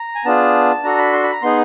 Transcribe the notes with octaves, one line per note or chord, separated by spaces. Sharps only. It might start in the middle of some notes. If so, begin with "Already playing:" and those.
Already playing: A#5
G#5
B3 D4 F4 G#4 A5
D4 F#4 A4 A#5
B5
C6
B5
A#5
B3 D#4 G#4 C6